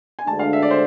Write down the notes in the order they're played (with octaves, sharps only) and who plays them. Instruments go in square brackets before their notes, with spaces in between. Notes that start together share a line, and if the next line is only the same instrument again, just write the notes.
[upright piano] G#5
[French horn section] D2 D3 G#3 D4 [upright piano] A5
[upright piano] F5
E5
D5
C5